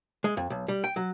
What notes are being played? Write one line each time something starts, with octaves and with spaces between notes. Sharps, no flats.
G#3
F2
B1
G3
G5
F#3